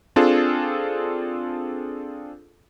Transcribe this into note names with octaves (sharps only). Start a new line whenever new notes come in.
C4 D4 F4 G#4 A4